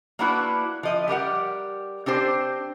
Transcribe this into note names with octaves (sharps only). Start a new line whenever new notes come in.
A#3 B3 D4 E4 F#4 B4
F3 D#5 E5
G3 G4 A#4 F#5
C4 D4 G4 C5